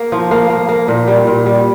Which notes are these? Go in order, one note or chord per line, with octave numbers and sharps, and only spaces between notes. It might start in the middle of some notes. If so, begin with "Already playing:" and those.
Already playing: A#3
F3
A#3
A#3
A#3
A#2
G3
A#2
G3